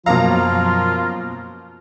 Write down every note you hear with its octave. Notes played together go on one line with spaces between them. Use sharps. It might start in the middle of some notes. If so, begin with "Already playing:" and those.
F#2 B2 F3 A#3 F4 F5 A#5